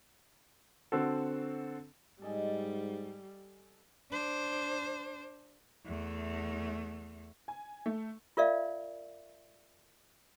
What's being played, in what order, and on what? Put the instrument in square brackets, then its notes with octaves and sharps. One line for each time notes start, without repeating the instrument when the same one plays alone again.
[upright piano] D3 C4 F#4 A4
[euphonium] G#2 [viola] G3 [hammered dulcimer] A4 D#5 G#5
[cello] D4 C5
E2 A3
[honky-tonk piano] G#5
A3
[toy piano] F4 A#4 D5 E5 F5